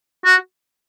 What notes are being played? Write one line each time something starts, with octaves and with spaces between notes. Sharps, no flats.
F#4